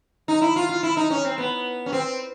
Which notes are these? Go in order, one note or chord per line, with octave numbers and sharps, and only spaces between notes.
D#4
E4
F4
F4
E4
D#4
C#4
C4
B3
C#4
C4